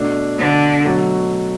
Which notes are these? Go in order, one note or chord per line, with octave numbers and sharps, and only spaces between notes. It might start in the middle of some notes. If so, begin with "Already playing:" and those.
Already playing: B2 A3 D4
D3
B2 F#3 A3